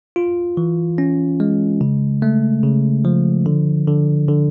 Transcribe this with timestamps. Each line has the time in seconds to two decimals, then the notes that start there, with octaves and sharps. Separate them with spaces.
0.16 F4
0.57 E3
0.98 C#4
1.40 G#3
1.81 C#3
2.22 A3
2.63 C#3
3.05 F3
3.46 D3
3.87 D3
4.28 D3